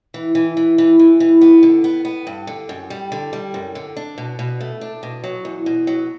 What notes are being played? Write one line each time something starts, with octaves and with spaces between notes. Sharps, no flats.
E3
E3
E3
E3
E3
E3
B3
D3
B3
B3
G2
D3
F#2
G3
D3
G3
F#2
D3
D4
B2
B2
A3
D4
B2
F#3
E2
B2
F#3